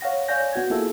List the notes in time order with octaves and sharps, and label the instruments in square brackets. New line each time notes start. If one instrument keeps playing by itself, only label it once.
[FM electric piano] C#5 F5 F#5 A#6
C#5 D5 F5 G#5 G6 A#6
B3 F#4 F#5 G#6
A#3 E4 F4 G#4 A4 E5